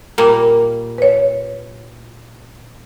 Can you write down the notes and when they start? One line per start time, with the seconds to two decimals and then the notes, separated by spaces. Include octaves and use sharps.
0.18 A#2 G3 A#3
0.98 B4 C#5